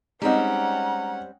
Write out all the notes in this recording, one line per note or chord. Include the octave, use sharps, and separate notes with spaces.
G3 G#3 C4 C#4 D#4 D#5 F#5 A#5